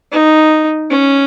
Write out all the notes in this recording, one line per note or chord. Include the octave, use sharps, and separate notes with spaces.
D#4
C#4